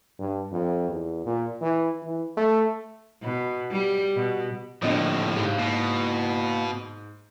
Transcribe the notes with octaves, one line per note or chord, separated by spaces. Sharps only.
G2
F2
E2
A#2
E3
E3
A3
B2
G3
B2
C2 A2 D3 F3 G3 A#3 D#5 D#6
G#2 G4 F5
B2 A#3 E4